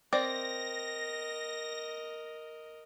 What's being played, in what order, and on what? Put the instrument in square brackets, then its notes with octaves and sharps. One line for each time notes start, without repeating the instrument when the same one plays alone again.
[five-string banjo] C4 D5 [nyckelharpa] A#4 D#5 [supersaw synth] A#6